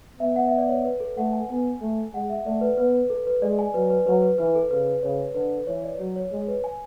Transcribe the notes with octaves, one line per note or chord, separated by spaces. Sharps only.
B3 E5
F#5
E5
D5
C#5
B4
A4
A3 F#5
G#5
B3 G#5
A3
G#3 F#5
E5
A3 D5
B4
B3 B4
B4
A4
B4
G#3 D5
G#5
F#3 B4
B4
F#3 B4
B4
E3 B4
A4
C#3 B4
B4
C#3 C#5
D3 B4
E3 C#5
D5
F#3 C#5
C#5
G#3
B4
G#5